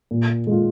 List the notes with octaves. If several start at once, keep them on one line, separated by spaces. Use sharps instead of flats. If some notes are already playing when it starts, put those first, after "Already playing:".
A#2
G#3 F4